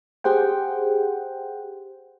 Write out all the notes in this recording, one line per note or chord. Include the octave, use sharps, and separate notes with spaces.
G4 G#4 C5 F#5 G5